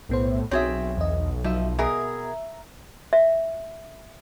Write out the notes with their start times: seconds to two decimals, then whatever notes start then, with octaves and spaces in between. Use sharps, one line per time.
0.09 B1 A2 B3 C5
0.51 B1 C4 F#4 G#4 C#5 E5
0.97 E2 D#5
1.44 F3 F#3 D#4 E5
1.79 B2 G#4 A#4 E5 A#5
3.13 E5